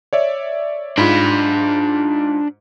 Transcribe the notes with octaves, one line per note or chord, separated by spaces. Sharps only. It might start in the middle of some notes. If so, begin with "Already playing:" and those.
C#5 D5 E5
G#2 D4 F4 B5